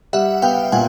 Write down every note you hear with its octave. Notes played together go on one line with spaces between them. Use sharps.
G3 E5 F#5
B3 F5 G5
A#2 F#5 G#5